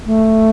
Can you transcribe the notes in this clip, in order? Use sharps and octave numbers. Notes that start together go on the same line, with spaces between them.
A3